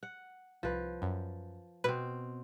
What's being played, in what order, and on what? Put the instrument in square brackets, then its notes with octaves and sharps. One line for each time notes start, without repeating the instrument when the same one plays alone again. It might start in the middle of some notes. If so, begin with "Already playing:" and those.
[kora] F#5
[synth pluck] C2 [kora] F3 B4
[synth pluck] F#2
[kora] B2 C4 [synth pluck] B4